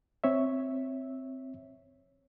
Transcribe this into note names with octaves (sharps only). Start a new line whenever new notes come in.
C4 C#5 E5